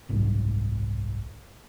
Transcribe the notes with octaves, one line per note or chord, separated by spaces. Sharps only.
F#1 C2 G#2